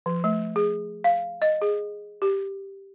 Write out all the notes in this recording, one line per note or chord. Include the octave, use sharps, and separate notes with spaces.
F3
A3
G#4
F5
D#5
G#4
G4